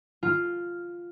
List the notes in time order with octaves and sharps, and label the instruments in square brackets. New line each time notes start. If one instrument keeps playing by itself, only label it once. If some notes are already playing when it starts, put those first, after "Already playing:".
[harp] F4